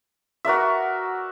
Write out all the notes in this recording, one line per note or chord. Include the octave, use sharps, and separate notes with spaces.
F#4 A#4 D5 E5